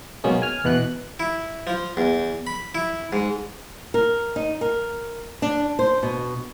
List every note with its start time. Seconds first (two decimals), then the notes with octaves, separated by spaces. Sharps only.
0.24 B2 F#3 G#3 A#3 C#4 D#4
0.42 G#5 F6
0.64 E2 B2 E3 F#6
1.20 E4
1.67 F3
1.97 E2
2.47 B5
2.75 E4
3.13 G#2
3.94 A#4
4.36 D#4
4.61 A#4
5.42 D4
5.79 C5
6.03 B2